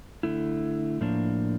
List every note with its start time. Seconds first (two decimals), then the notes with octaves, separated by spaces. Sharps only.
0.23 D3 A3 E4
1.01 A2 F3 A#3 D4